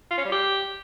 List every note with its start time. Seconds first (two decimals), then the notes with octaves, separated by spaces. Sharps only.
0.11 F4
0.18 C#4
0.25 G3
0.32 G4